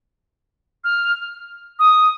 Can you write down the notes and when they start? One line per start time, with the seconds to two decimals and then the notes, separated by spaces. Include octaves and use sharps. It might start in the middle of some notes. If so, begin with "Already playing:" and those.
0.84 F6
1.79 D#6